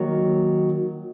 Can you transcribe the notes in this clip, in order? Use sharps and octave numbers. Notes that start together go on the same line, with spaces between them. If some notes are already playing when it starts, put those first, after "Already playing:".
Already playing: D#3 F#3 A#3